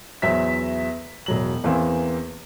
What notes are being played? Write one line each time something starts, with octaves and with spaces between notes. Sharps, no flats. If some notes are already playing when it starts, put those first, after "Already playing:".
E2 F#3 C5 E5 B6
E1 F#3 F#7
E2 E3 A#3 C4